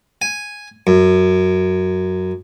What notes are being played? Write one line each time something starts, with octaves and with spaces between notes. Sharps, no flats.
G#5
F#2